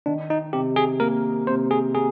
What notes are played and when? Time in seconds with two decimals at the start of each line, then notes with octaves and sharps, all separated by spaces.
0.06 D#3 D4
0.30 D#4
0.53 C3 G4
0.76 G#4
1.00 A#3 A#4
1.47 C3 C5
1.71 G#4
1.95 A#3 G#4